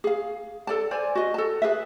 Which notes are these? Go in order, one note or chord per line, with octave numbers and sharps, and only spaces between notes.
G#4 F5
A4 D5 A5
C5 D5 G#5
F#4 D#5
A4 A5
G#4 B4 E5